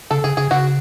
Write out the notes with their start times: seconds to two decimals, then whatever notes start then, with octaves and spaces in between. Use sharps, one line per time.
0.11 C#3 A4
0.24 C#3 G#4
0.37 C#3 G#4
0.51 C#3 F#4